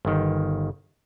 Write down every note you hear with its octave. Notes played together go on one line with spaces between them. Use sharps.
G1 D#3